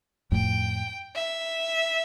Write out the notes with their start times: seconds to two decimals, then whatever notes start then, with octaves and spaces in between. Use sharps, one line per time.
0.32 F2 A2 G5
1.15 E5